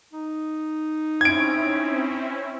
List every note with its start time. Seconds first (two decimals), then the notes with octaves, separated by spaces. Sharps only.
0.13 D#4
1.21 C4 C#4 E4 G#6 D7